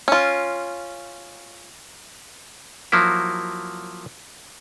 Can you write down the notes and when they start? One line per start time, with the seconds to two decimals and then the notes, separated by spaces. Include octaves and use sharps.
0.08 C#4 F4
2.92 F3 F#3 A#3 E4